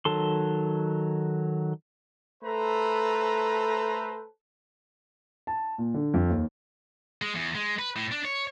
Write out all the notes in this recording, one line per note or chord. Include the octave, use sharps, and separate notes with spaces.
D#3 F#3 A4 C6
A3 A4 B4 C5 A#5
A5
A#2
D3
F2
D#2
G#3
E2
G#3
B4
A2
D4
C#5